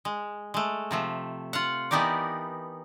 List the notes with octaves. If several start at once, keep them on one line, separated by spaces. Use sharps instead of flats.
G#3
G#3 A3
C3 F3 A3
F4 F5 F#5
E3 B3 D#4 G4 A#4 D5